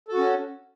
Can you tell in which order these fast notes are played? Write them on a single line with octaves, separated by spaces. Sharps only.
A4 F#4 C#4